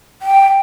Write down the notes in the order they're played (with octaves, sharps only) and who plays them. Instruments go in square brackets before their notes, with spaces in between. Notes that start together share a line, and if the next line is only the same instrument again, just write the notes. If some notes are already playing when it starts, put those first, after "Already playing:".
[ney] G5